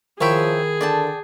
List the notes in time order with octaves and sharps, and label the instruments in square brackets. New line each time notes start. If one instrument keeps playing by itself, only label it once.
[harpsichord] D#3 E4 [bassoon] F3 [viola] G#4 [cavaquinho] C#5 E5 G5
[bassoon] D3 [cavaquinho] D5 G5 A5